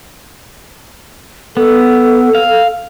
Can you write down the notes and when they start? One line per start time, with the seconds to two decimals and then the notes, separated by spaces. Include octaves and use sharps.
1.57 B3 A4
2.35 F5